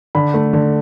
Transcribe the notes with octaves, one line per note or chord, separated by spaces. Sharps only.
D3 B5
A3
D3